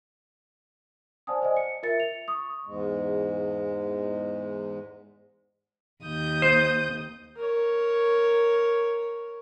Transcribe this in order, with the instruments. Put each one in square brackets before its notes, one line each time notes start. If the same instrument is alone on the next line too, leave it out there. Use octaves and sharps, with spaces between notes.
[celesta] C5 D5 F#5 G#5 A5 D#6
C5 D5 D#5 G#5
C#7
F4 A#4 E5 A6 C#7
F7
C#6 D#6
[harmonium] E2 G#2 G#3
[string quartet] D#2 D#6 G6
[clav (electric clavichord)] C5
[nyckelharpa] A#4 C#5